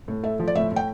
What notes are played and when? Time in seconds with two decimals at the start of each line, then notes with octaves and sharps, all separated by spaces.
0.08 A2
0.23 A3 E5
0.39 F3
0.48 D5
0.55 A2 E5
0.72 A2 G5